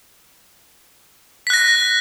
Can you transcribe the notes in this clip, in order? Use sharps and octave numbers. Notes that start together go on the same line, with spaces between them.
F#6 A#6 B6